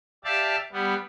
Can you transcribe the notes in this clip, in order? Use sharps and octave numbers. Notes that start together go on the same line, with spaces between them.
G4 D5 E5 F5 A5
G3 B3